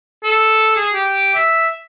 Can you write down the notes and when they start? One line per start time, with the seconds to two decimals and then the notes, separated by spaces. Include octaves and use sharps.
0.24 A4
0.76 G#4
0.94 G4
1.35 E5